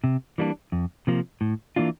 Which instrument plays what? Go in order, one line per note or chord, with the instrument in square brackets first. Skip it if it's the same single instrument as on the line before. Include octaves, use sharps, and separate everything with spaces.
[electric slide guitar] C3
E3 G3 A#3 D4
F2
C3 F3 A#3
A2
E3 A#3 D4 F4